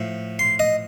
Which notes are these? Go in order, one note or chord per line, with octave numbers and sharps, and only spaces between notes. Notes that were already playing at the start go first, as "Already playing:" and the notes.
Already playing: A2 F3
C6
D#5